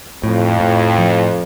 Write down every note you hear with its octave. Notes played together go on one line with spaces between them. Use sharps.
F2 A2
A2
F3